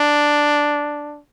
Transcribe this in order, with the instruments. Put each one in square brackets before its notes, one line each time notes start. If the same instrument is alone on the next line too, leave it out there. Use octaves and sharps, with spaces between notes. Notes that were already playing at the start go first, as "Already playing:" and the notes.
Already playing: [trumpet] D4